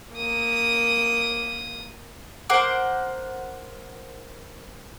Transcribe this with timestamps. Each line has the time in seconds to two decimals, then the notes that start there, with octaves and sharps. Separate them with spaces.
0.14 A#3 D#6
2.49 A#4 C5 F#5 D6